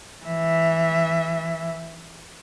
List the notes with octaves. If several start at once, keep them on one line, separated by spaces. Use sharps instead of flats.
E3 E5